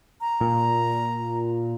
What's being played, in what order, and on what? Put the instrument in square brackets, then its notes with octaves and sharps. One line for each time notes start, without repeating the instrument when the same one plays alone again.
[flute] A#5
[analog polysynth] A#2